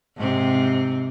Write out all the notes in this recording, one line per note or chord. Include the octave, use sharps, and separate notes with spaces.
G#2 C3 C4